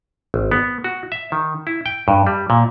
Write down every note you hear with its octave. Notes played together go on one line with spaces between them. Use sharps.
G#1
B3
F#4
E5
D#3
E4
G5
G2
G3
A#2